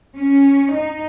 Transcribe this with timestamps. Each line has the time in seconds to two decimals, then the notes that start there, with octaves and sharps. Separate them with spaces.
0.16 C#4
0.72 D#4